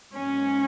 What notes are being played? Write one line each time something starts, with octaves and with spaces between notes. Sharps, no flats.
G#2 F#3 A#3 C#4